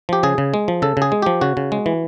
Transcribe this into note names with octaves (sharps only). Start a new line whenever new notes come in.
F3 G4
C#3 G#4
C#3
G#3
F3
C#3 A4
C#3 G#4
G#3
F3 G4
C#3 F#4
C#3
G#3
E3